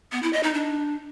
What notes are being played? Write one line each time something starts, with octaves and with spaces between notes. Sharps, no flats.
B3
E4
D#5
D#4
D4